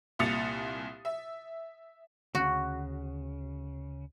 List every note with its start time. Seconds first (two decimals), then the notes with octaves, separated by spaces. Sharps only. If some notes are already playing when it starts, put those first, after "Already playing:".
0.19 C2 A#2 D#6 A6 C#7 F7
1.05 E5
2.35 D2 C#3 F#4